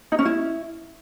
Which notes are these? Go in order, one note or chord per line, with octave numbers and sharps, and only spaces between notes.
D#4
C#4
E4